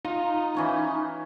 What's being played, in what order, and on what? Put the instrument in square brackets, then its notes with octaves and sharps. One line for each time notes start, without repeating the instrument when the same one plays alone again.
[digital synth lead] D#4 [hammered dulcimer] F4
[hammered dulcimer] E3 C#4 B5